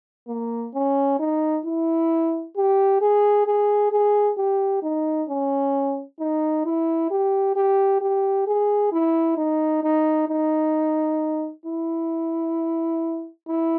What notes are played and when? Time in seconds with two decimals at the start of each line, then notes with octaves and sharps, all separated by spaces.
0.28 A#3
0.74 C#4
1.19 D#4
1.65 E4
2.57 G4
3.01 G#4
3.47 G#4
3.92 G#4
4.37 G4
4.83 D#4
5.29 C#4
6.20 D#4
6.65 E4
7.11 G4
7.56 G4
8.01 G4
8.47 G#4
8.92 E4
9.37 D#4
9.83 D#4
10.29 D#4
11.66 E4
13.48 E4